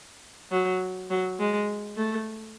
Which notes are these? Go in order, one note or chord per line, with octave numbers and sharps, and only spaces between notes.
F#3
F#3
G#3
A3